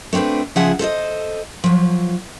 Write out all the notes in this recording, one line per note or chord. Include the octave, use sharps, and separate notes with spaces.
A3 C4 D4 F#4 B4
C#3 F3 F4 G#4 E5 F#5
A4 C5 D5 D#5
F3 F#3